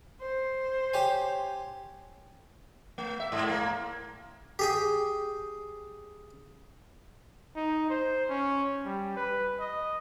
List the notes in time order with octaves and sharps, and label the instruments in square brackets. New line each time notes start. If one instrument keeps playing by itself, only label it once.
[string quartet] C5
[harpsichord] G4 C#5 G#5
[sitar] A3
E5
G#2
A#3
[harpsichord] G4 G#4 G5
[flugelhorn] D#4
C5
C#4
G3
B4
D#5